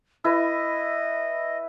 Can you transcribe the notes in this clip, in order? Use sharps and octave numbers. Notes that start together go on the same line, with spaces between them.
E4 B4 D#5